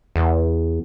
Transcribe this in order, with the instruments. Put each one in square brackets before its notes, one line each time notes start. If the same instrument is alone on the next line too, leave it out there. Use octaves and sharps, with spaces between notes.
[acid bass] E2